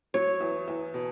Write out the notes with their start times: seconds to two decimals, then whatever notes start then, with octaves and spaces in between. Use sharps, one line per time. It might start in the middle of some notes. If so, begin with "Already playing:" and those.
0.14 F#3 C#5
0.41 E2
0.68 E2
0.94 B2